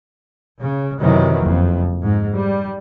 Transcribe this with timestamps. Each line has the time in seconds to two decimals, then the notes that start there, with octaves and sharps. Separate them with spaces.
0.58 C#3
0.99 F#2 C3 D#3 E3 F#3
1.41 F#1 F2
2.03 G#2
2.33 G3